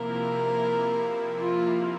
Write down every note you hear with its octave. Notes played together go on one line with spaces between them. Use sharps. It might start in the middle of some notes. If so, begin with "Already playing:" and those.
Already playing: C3 F3 A#3 E4 A#4
F4